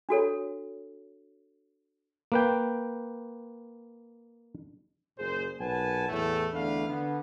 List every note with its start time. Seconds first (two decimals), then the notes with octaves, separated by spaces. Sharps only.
0.09 D4 F#4 A4 C#5
2.32 A#3 B4 G5
5.18 F#1 A#2 A#3 G#4 C5
5.60 B1 A#2 B4 F#5 G#5 A5
6.08 E2 A2 A3
6.53 E2 D3 A3 D4 B4 F5
6.88 D3 B3